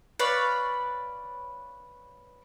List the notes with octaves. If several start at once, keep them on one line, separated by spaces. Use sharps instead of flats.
B4 C#5 D5 F5